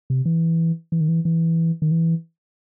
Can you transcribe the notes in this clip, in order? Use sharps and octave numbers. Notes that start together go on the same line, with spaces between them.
C3
E3
E3
D#3
E3
E3
D#3
E3